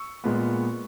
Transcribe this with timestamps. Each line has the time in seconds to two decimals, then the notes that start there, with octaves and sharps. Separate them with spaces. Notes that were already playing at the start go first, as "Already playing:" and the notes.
Already playing: C#6 E6
0.24 A#2 G#3 B3